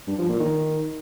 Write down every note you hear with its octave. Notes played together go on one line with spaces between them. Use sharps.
G2
F3
A#2
D#3